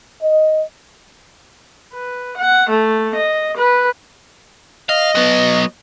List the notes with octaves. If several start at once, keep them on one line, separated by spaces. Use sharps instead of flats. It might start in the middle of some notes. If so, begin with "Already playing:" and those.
D#5
B4
F#5
A3
D#5
B4
D#5 F5
F#3 B3